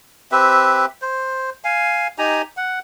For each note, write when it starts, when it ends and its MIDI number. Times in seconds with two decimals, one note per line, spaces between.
0.32 0.86 60
0.32 0.86 67
0.32 0.86 71
0.32 0.86 76
1.02 1.50 72
1.64 2.07 77
1.64 2.07 80
2.18 2.42 63
2.18 2.42 67
2.18 2.42 80
2.18 2.42 82
2.57 2.79 78